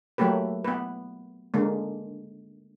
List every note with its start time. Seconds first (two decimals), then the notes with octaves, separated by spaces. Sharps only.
0.18 F#3 A3 A#3 G4 B4
0.65 B3 B4
1.54 D3 G#3 A#3